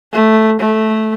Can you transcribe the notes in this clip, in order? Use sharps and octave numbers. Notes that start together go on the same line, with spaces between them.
A3
A3